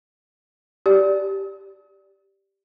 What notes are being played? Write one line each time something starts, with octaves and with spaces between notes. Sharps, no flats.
G4 D5